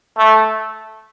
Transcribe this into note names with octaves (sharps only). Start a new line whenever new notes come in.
A3